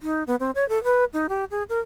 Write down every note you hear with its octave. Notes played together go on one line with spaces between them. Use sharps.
D#4
B3
C4
C#5
A4
B4
D#4
G4
G#4
A#4